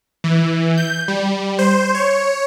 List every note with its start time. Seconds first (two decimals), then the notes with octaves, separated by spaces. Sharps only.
0.24 E3
0.78 G6
1.08 G3
1.59 C5
1.95 C#5